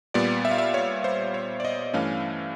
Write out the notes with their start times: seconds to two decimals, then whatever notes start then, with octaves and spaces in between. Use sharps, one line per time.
0.14 A#2 G3 B3 D5
0.45 E5
0.51 F5
0.58 E5
0.74 C#5
1.04 C5
1.34 C#5
1.60 D5
1.65 D#5
1.94 G2 E3 A3 C#4 F5